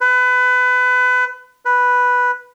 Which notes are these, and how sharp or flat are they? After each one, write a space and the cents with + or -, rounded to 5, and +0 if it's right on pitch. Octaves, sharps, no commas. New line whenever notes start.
B4 +25
B4 -5